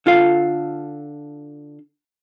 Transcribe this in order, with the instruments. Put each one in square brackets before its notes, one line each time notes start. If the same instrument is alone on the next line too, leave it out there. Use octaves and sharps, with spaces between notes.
[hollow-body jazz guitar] D3 F4 A4 F5